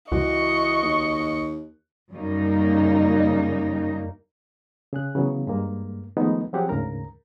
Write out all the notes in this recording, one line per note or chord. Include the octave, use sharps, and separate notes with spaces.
C#2 E3 F#4 D#5 C#6
D#2
F#2 C#3 G3 A#3 D#4
C#3 G#4 F#6
C#3 E3 F#3 B3
G2 G#3 A#3
D#3 F3 G#3 A3 B3 D#4
F3 F#3 C4 G4 G#4 F#5
D2 G#2 C#3 A#4 A#5